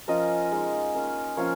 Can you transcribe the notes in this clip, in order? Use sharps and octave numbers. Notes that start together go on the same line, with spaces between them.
F3 C#4 F4 A#4 D#5
G#3 D#4
A#3 C#4 F4
F3 A#3 C#4 F4 C#5 F5